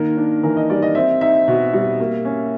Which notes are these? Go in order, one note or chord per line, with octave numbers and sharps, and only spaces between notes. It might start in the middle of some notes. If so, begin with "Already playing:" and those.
Already playing: D#3 A#3 A#4
D4
E3 A#4
D#5
G3 D5
D#5
C4 E5
D#4 E5
B2
G3
A#3
C#4